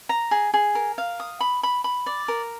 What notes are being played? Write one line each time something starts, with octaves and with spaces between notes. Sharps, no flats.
A#5
G#4
G#4
A#4
F5
D#6
B5
B5
B5
D5
A#4